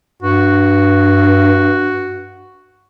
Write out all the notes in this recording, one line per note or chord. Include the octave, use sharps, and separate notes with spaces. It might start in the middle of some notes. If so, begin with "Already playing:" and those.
G2 F#4